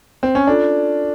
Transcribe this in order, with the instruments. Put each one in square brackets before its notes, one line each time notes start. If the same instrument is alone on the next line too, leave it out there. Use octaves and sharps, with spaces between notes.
[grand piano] C4
C#4
[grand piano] D4 [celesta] F4 A4 D5